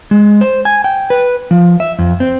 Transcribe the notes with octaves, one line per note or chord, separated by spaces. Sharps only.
G#3
C5
G#5
G5
B4
F3
E5
F2
C4